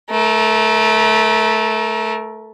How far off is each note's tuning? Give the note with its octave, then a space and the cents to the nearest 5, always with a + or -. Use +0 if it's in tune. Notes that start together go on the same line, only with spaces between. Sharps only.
A3 -15 A#4 +20